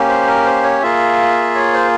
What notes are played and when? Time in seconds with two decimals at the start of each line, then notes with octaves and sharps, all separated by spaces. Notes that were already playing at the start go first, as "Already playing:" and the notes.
Already playing: A#3 C#4 G4
0.09 C5
0.27 A#4
0.45 C5
0.64 C#5
0.82 A#3 F4 G#4 E5
1.55 C#5
1.73 C5